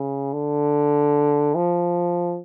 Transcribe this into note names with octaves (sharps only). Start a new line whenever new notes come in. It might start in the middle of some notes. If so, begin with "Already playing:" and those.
Already playing: C#3
D3
F3